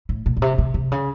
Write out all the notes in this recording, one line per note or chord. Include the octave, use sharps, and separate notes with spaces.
A2
A#2
A#2
C3
C3
C3
C#3